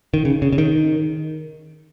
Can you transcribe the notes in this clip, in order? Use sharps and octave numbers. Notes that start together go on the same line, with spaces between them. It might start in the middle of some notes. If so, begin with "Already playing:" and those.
D#3
C#3
C#3
C#3
D#3